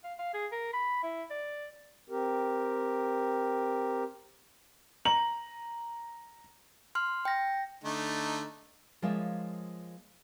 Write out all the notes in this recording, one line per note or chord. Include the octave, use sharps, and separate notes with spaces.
F5
F5
G#4
A#4
B5
E4
D5
C4 G4 A#4
A#5 F#7
C6 F6
G5 A#6
D3 A3 D#4
F3 G#3 A#3 F4 C#5 E5